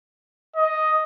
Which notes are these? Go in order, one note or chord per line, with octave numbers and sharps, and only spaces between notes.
D#5